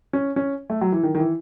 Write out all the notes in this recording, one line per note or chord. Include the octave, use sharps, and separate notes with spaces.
C#4
C#4
A3
F#3
E3
D#3
D#3
E3